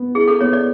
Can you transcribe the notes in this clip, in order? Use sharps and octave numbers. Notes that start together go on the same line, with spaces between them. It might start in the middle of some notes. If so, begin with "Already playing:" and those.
Already playing: B3
E4 G#4
A4
B3 C#5
D5